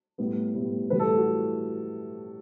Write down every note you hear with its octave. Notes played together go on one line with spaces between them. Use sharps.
A2 G3 B3
A2 G3 B3
A2 E3 G3 B4
A4
F#4